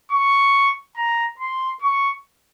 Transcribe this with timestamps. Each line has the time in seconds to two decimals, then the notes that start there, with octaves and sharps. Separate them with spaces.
0.12 C#6
0.97 A#5
1.39 C6
1.82 C#6